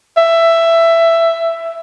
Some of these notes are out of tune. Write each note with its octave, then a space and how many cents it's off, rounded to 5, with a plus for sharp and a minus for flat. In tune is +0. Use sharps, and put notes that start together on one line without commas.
E5 +10